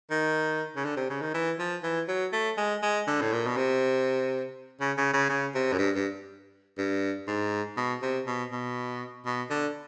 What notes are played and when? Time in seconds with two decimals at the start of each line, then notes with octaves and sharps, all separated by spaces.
0.11 D#3
0.76 C#3
0.85 D3
0.97 C3
1.10 C#3
1.21 D#3
1.34 E3
1.59 F3
1.83 E3
2.08 F#3
2.33 A3
2.57 G#3
2.83 G#3
3.07 D3
3.21 A2
3.32 A#2
3.47 B2
3.57 C3
4.80 C#3
4.97 C#3
5.13 C#3
5.29 C#3
5.55 C3
5.72 F#2
5.79 G2
5.95 G2
6.78 G2
7.27 G#2
7.77 B2
8.02 C3
8.27 B2
8.52 B2
9.26 B2
9.50 D3